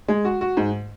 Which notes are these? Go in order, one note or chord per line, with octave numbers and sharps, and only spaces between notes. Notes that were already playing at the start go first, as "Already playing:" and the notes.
G#3
F#4
F#4
G#2